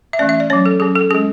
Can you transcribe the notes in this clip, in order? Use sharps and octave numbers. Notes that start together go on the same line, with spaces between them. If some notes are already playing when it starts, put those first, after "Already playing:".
E5
E3 A3 C#4 D5
E5
D5
F#3 C#4 C#5
A4
F#3 C#4 G#4
A4
G#3 C#4 G#4